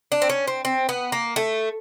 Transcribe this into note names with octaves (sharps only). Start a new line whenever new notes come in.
D4
C4
C#4
C4
C4
B3
A#3
A3